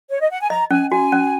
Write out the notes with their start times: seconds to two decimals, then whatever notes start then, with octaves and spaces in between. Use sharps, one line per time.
0.10 C#5
0.20 D#5
0.31 F#5
0.41 G#5
0.50 D#5 A#5
0.71 C#4 G#5
0.91 F#4 G#5
1.12 C#4